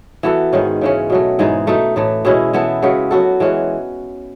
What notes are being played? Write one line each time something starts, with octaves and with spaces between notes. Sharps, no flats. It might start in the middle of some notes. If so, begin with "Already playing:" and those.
E3 B3 F#4 A4
G#2 D#3 G#3 C#4
C#3 E3 G#3 C#4
B2 F#3 A3
G#2 E3 G#3 D#4
B2 A3 D#4 A4
A2 E3 A3
B2 G#3 C#4 E4
E3 B3 E4 A4
C#3 G#3 B3 F#4
F#3 B3 F#4 A4
E3 G#3 C#4 F#4